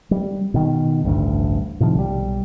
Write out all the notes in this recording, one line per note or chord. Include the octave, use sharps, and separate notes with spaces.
G3
B2 D#3
A1 D2 G2
A2 C3 D#3 F3
B1 G3